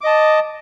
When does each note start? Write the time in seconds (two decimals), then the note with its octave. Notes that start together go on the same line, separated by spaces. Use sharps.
0.01 D6
0.04 D#5
0.07 A5